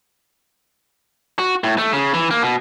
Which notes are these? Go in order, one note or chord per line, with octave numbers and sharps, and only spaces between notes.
F#4
A2
A3
C#3
E3
A#3
B2